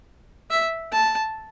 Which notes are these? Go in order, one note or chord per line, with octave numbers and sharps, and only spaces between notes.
E5
A5